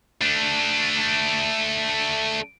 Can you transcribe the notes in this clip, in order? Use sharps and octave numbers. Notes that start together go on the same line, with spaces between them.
A3 D4